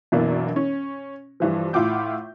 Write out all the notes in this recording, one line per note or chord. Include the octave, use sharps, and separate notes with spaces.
F#2 B2 E3 A#3 D4
C#4
G2 E3 F3
A2 E4 F4 F#5 D6 G6